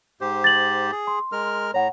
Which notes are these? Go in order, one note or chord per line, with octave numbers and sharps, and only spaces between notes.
G#2 G4 C5
A6 F#7
G#4
C6
G#3 A#4 F6
A2 C#5 F#5 A#5